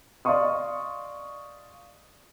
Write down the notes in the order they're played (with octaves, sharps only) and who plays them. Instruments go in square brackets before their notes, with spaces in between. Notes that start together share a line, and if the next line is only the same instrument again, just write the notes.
[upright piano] D5 D#5 F5 C6 C#6 D#6